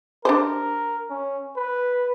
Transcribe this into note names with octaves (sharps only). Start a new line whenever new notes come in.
D4 G4 A#4 C5
C#4
B4